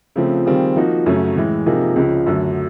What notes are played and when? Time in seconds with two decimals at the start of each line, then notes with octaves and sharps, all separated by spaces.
0.16 C#3 F3 A3 C4
0.46 D#3 G3 C4 F4 G#4
0.76 F3 A#3 D#4 F#4
1.06 F#2 C#3 F#3 A3 C#4
1.36 A2 E3 G#3
1.66 C3 F3 A#3 D#4 G#4
1.96 C#2 C#3 F3
2.26 F#2 D3 F#3 A3